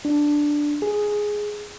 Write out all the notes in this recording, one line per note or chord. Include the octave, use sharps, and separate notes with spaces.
D4
G#4